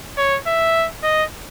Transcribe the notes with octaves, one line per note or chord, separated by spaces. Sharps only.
C#5
E5
D#5